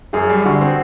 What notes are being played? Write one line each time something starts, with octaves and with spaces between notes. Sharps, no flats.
F#2 G#4
G3
D3 F#4
C4